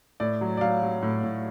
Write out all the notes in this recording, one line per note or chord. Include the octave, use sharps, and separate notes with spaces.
A2 D5
F#3
D5
F#3 F5
F#3
A2
A2